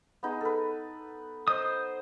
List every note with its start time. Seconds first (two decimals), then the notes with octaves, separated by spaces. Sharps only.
0.23 B3 D#4 G#4
0.41 A4 B4
1.48 C5 D#5 D#6